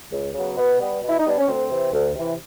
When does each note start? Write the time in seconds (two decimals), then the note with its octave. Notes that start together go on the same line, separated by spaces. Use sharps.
0.12 C#2
0.34 C#3 F#3 B3
0.57 B2 B3
0.80 G3 B3
1.02 B2
1.09 E4
1.19 D#4
1.25 G3 B3 D4
1.38 C#4
1.47 D2 C4
1.71 C3 E3
1.93 D2
2.15 C3 E3